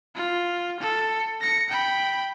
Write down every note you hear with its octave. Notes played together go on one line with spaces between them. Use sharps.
F4
A4
A#6 C#7
G5 B5